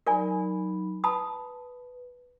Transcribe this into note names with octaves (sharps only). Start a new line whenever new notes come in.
F#3 D#4 A#4 D5 G#5 B5
B4 A5 B5 D#6